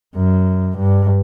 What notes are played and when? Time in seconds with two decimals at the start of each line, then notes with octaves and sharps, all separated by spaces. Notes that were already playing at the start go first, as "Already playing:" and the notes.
0.16 F#2
0.78 G2